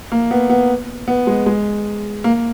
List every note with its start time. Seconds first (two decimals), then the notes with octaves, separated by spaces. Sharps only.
0.12 A#3
0.31 B3
0.50 B3
1.08 B3
1.27 G#3
1.46 G#3
2.24 A#3